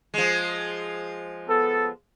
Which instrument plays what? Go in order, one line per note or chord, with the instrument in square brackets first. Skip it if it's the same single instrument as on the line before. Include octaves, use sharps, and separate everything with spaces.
[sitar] F3 G#3
[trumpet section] B3 A4